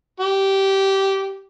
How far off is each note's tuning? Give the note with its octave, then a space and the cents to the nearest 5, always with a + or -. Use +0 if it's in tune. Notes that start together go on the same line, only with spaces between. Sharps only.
G4 -15